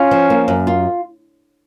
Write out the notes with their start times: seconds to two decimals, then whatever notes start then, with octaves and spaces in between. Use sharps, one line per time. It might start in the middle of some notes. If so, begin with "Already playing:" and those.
Already playing: C#4 F4
0.11 F3
0.30 A#3
0.48 F#2
0.67 F4